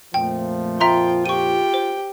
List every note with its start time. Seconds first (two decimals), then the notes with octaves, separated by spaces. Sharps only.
0.14 F2 A#2 F3 A3 G5
0.80 F4 E5 G5 A#5 C6
1.26 F4 G4 G5 C#6 D#7
1.74 C5